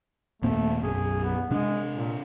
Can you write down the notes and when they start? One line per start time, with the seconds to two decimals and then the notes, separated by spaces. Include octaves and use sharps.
0.42 D#2 A#2 A3 C4
0.83 B1 F#2 G#4
1.24 B3
1.51 C3 G#3 D4
1.94 A#2